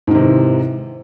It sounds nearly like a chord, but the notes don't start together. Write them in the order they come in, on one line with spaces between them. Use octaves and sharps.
G#2 D#3 C3 E3